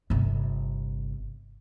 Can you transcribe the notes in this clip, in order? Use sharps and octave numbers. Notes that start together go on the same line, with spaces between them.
G1 C3